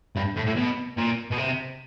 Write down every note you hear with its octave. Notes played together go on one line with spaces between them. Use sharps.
G2
A2
A2
B2
A#2
B2
C3